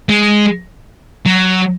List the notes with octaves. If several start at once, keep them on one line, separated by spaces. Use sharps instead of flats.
G#3
F#3